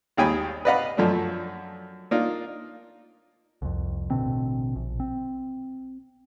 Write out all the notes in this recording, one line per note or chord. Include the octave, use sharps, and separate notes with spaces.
G#1 D#2 D#4 G5 G#5 B5
B4 D5 D#5 F5 F#5 B5
F#2 F3 A3 D4
A#3 D4 D#4 F4
C2 F2
A1 B2 D3 C4
A#1
C4